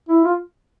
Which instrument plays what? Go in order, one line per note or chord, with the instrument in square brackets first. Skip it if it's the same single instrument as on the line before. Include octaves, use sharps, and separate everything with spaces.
[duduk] E4
F4